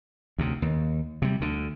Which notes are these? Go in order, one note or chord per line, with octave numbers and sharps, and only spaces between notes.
D2 C3
D#2
C3 G3
D2 D3